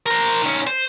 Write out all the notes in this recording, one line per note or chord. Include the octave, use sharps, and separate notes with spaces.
A#4 C5
D#3 C#4
C5